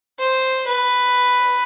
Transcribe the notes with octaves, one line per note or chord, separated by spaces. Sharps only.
C5
B4